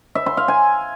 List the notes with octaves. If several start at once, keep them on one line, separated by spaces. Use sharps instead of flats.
E5
C6
F5
G#5